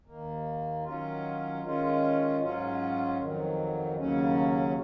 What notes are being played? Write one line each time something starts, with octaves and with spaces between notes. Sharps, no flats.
D#2 D#3 A#3
D#3 F#3 C#4 F4
D#3 G#3 C#4 F4
G#2 F#3 C#4 F4
F2 D#3 F#3
D#2 C#3 F#3 C#4